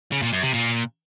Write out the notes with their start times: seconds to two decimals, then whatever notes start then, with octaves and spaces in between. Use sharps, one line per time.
0.12 C#3
0.22 A#2
0.33 F#2
0.43 C3
0.54 A#2